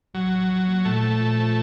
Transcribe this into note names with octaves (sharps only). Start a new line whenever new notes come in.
A1 F#3
A1
F3
A#3
A#2 A3
F3
A#2
F3